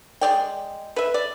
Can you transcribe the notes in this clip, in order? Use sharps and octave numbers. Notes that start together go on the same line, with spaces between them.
G#3 D5 G5
B4 E5
D5